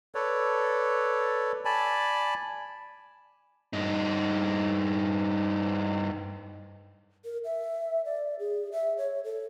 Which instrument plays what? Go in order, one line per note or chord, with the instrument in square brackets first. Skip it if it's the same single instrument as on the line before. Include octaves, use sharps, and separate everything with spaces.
[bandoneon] A4 B4 C#5 D5
D5 G#5 A5 B5
[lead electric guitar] G2 D#4
[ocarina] A#4
E5
D5
G#4
E5
C#5
A4